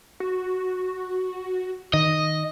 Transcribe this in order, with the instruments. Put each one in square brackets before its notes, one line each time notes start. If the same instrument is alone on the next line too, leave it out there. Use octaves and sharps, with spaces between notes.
[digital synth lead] F#4
[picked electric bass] D#3 [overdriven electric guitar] D#5